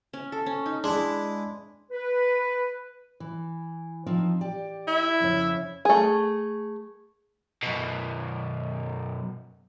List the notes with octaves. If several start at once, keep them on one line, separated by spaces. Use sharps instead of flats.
C#4
A4
C#4
D#4
G#3 D4 E4
B4
E3
F3 C4 D#4
G4 D5
E4
F2 C#3 C#5
A3 G#4
F#2 B2